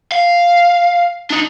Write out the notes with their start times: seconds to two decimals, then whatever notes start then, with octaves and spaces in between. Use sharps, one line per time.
0.12 F5
1.31 D4 D#4